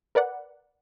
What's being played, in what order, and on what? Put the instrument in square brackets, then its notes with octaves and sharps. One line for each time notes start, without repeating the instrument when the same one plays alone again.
[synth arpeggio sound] A#4 B4 D5 F#5